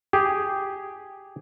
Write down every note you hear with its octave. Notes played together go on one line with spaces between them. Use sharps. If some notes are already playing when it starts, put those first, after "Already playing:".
G4 G#4